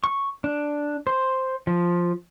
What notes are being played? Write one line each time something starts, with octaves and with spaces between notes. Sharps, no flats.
C#6
D4
C5
F3